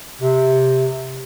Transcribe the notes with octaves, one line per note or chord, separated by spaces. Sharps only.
C3